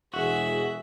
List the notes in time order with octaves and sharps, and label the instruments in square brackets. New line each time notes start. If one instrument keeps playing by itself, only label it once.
[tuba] E1 [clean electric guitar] F#4 [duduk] G#4 [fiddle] E5